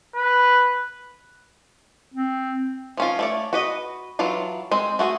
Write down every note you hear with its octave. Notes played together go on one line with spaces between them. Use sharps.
B4
C4
F3 C#4 F4
A3 C#5 D5
F#4 B4 D#5
E3 F#3 D4 F4
G#3 C4
A3 F#4 G#4